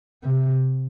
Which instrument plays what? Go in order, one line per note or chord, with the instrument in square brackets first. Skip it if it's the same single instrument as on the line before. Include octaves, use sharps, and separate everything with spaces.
[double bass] C3